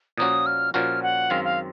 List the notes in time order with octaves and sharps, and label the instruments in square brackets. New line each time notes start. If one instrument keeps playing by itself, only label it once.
[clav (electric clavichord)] A#2 F3 A#3 C#4 F#4 [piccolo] D#6
[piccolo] F6
[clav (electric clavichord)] A#2 F3 A#3 C#4 F#4 [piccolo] F6
[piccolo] F#5
[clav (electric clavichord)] F#2 D#3 G#3 C4 [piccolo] F5
[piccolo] F5